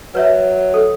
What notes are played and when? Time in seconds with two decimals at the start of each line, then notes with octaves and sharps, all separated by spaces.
0.15 F#3 B4 C#5 E5
0.74 A4